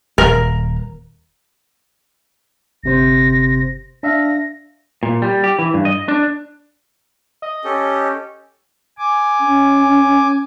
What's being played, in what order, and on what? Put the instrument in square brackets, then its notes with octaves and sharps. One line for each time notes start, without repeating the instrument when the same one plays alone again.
[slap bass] D#1 [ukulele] A#4
[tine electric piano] G1 C3 C5 [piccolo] A#6
[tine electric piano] D4 E5 F5 [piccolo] A#6
[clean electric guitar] A#2
G3
G4
E3
G2
D#5
D4
[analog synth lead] D#5
[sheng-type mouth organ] C#4 G4 A4
[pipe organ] G#5 D6
[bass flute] C#4